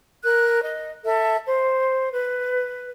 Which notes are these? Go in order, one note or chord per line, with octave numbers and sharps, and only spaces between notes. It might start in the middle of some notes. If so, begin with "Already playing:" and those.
A#4 F#6
D#5
A4 E5
C5
B4